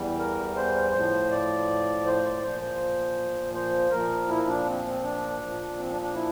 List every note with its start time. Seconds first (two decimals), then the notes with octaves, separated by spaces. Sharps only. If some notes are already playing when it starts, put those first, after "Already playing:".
Already playing: E2 E3 G3
0.19 A#4
0.56 C5
0.94 A2 F3
1.31 D5
2.06 C5
2.23 D5
2.42 A#2 F3 C5
2.62 C5
3.54 C5
3.91 A#2 F3 A#4
4.29 E4
4.48 D4
4.66 C4
4.85 C4
5.03 D4
5.41 A#2 F3
5.78 C4
5.90 D4
6.02 D4
6.14 E4